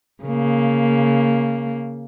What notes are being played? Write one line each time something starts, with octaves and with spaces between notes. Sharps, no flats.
C#3 A#3